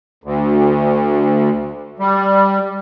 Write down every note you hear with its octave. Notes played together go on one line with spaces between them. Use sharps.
D2
G3